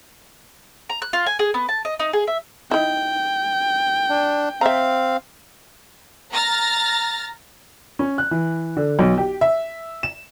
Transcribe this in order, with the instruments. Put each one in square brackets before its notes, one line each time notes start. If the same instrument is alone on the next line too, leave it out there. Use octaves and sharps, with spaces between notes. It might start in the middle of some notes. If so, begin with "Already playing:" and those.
[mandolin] A#5
F#6
F4
G#5
G#4
B3
A5
D#5
D#4
G#4
E5
[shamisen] D#4 E4 [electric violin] G5
[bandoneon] D4
[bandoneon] C4 F5 [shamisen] E5 A#5
[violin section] A#5 F6 A6 A#6
[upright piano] C#4
F#6
E3
D3
B1
G4
E5
E7